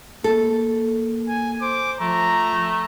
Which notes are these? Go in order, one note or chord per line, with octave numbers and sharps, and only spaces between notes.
A#3 A4
G#5
C5 D6
F3 A3 A#5